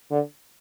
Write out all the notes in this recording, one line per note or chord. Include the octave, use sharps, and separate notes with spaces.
D3